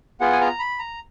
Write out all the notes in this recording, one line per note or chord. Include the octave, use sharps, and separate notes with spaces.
B3 F4 G#4 F#5
G#5
A#5
B5
A#5